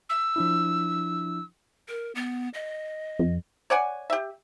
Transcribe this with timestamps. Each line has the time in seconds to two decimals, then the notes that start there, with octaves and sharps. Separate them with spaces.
0.09 E6
0.36 F3 D4 E4
1.89 A#4
2.15 B3
2.54 D#5
3.19 F2
3.70 C#5 D5 F#5 G#5
4.10 G4 E5